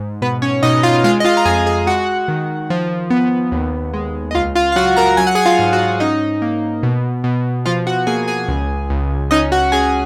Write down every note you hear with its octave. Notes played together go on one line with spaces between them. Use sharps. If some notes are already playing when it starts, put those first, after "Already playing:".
Already playing: G#2
B2 B3 B4
C#4 C#5
B2 D#4 D#5
F4 F5
G#3 F4 F5
D#5
F4 F5
A#5
F2 G#4 G#5
G#4 G#5
G#3 F#4 F#5
D#3
F3
B3
D#2
G#3
D#5
C#2 F4 F5
F4 F5
F5
F#3 F#4 F#5
A#4 A#5
F#3 G#5
F#5
G#4 G#5
F4 F5
G#2
F#4 F#5
C#4 D#4 D#5
A#3
B2
B2
F3 F4 F5
F#4 F#5
A#3 G#4 G#5
G#4 G#5
C#2
C#2
C#4 D#4 D#5
F#4 F#5
C#4 G#4 G#5